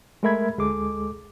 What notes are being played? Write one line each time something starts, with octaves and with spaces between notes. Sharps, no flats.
G#3 A3 A#4 E5 B5 G#6
D2 G#3 G#4 A4 D6